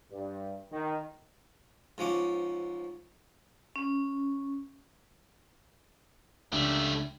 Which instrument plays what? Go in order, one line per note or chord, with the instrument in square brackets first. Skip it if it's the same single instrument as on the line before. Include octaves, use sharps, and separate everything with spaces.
[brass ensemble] G2
D#3
[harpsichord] G#2 F3 C#4 D6
[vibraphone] C#4
[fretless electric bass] C#2 D4 [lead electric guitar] A3 G4